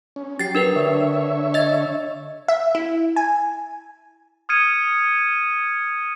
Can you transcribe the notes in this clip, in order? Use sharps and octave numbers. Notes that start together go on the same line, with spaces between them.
C#4
F#3 G4 A6 C7
D4 A#4 B4
D3 C#5 E5
D#5 A6
E5
E4
G#5
D#6 F6 G#6 C#7 D#7